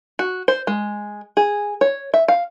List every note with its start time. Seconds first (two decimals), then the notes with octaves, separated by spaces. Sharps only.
0.19 F#4
0.48 C5
0.67 G#3
1.37 G#4
1.81 C#5
2.14 E5
2.28 F5